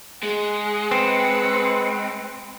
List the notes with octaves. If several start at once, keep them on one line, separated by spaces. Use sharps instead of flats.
G#3 F#5
C4 B4